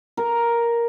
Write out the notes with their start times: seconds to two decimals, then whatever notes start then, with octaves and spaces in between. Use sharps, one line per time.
0.17 A#4